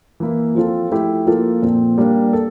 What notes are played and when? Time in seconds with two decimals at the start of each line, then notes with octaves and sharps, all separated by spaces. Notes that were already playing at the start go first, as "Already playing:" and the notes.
0.20 E3 A#3 E4
0.55 F3 C4 F4 A4
0.91 F3 A3 E4 G4
1.26 F3 A#3 F4 A4
1.62 A#2 F3 C4
1.98 G3 A#3 D4
2.33 A4